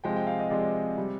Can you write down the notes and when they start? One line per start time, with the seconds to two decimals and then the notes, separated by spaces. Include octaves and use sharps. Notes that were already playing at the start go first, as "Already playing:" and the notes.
0.04 C3 F3 G#3 G5
0.16 G5
0.27 F5
0.40 D#5
0.51 C3 F3 G#3 D5
0.97 C3 G3